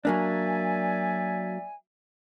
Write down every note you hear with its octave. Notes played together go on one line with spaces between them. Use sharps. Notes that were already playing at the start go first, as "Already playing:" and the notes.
F#3 A#3 D4 D5 E5 G#5